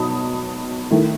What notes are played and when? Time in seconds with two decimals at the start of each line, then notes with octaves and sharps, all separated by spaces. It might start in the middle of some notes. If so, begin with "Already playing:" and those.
Already playing: B2 F#3 D#4 A5 B5 D#6
0.91 D#3 A3 E4